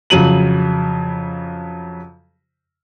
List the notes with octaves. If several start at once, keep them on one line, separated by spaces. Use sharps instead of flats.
F2 C#3 F#3 D#7 F#7